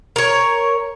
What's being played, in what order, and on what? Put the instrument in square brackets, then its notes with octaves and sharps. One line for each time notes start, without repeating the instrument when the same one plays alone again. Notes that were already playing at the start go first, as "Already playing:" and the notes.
[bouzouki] A#4 C#5